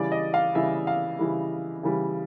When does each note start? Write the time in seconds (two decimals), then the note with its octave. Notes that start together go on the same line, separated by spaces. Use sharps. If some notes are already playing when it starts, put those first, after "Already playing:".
Already playing: C#3 E3 G3 D5
0.12 D#5
0.34 F5
0.55 C#3 E3 G3 E5
0.87 F5
1.19 C#3 E3 G3
1.83 C#3 E3 G3